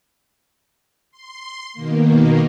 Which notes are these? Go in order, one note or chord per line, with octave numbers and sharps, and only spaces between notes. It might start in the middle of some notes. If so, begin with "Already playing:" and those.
C6
B2 D#3 A#3